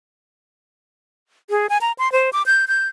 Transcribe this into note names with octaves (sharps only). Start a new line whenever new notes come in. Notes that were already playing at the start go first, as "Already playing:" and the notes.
G#4
G#5
A#5
C6
C5
D6
G6
G6